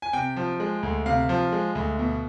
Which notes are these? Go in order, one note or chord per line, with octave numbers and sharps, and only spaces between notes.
G#5
C3 G5
F3
G#3
D2
C3 F5
F3
G#3
D2
B2